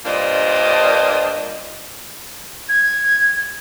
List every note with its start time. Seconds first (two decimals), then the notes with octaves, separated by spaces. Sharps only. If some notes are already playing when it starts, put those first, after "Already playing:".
0.06 G2 A#2 A#3 D4 C5 D#5
2.69 G#6